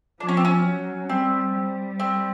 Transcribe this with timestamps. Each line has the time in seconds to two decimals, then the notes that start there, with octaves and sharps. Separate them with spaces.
0.20 F3 D4
0.28 C#4
0.37 C4
0.45 C#4
0.65 F#3
1.09 G3 C4
1.55 G3
2.00 C4